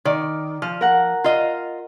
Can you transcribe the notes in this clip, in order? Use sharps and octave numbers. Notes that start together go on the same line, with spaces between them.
D#3 D5
F3 F6
A#4 F#5
F4 D#5